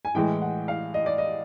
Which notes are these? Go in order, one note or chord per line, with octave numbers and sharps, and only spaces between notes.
G#5
A2 E3 G#3 G5
F#5
F5
D#5
D5
D#5